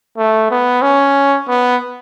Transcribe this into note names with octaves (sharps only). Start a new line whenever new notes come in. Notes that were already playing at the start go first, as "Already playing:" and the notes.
A3
B3
C#4
B3